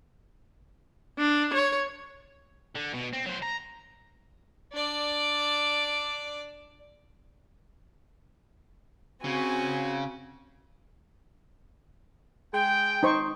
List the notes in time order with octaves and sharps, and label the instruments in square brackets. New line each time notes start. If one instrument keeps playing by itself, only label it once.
[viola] D4
C#5
[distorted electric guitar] D3
B2
C4
F#3 C5
A#5
[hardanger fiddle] D4 D5
[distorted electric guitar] C#3 [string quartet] C4 F#4 G#5
[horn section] G#3 G#4 G5
[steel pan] D#4 C5 C#6